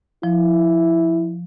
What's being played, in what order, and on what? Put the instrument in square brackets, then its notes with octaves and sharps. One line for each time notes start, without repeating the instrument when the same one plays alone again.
[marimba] F3 [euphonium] E4